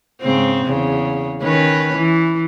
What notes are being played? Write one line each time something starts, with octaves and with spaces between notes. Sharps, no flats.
G#2 C#3 C4
E2 C#3
D#3 C#4 B4
E3